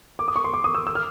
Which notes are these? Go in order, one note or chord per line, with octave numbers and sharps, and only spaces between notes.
D6
D#6
C#6
C6
D6
D#6
E6
E6
F6